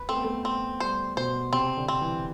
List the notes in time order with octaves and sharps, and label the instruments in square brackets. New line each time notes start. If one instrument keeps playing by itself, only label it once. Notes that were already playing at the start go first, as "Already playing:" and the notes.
Already playing: [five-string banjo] B4
[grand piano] A3 [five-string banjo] C4
[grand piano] B3
A3
[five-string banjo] C4
[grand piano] G3 [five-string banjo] C5
[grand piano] B2 [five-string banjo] C5
[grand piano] C3 [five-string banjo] C4
[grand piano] D3
[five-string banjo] C4
[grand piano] E3